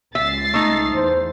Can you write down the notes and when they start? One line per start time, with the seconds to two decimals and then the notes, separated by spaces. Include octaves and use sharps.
0.15 C#2 E5 A6 C7
0.54 A3 D#4
0.95 E2 C5